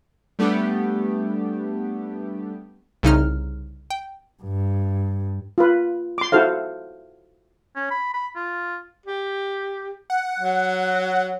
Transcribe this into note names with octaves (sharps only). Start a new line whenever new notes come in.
G3 A3 B3 D4 G4
C2 C#3 D#4 F6
G5
G2
F4 B4
C6 D6
E4 F#4 A4 C5 F5
C#4
B5
B5
F4
G4
F#5
F#3